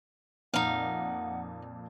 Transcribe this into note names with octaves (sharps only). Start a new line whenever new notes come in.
F2 A#2 D#4 F5 F#5